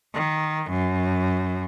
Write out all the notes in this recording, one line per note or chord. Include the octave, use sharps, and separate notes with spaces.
D#3
F#2